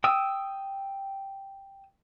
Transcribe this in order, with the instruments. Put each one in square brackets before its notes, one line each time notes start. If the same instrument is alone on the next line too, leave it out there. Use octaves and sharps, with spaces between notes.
[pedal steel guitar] G5 D#6 E6